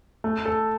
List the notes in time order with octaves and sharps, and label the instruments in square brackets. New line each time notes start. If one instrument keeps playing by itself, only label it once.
[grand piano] A3
A4